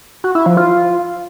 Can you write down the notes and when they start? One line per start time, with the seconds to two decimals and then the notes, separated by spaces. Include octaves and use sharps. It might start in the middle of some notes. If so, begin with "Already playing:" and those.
0.24 F#4
0.35 E4
0.46 F3
0.57 F4